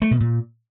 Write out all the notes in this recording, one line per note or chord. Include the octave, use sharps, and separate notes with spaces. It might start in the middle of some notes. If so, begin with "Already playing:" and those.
A3
B2
A#2